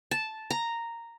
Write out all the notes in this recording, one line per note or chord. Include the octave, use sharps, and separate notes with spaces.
A5
A#5